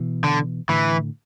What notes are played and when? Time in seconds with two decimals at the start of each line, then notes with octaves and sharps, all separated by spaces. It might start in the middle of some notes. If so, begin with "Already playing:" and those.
Already playing: B2 E3
0.24 D3
0.69 A2 D3 E3